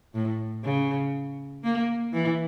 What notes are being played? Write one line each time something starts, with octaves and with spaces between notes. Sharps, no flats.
A2
C#3
A#3
E3